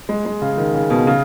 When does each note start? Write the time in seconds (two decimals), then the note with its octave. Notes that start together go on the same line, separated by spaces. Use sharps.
0.09 G#3
0.25 G#3
0.42 C#3
0.58 D#3
0.75 C#3
0.90 B2
1.07 C#3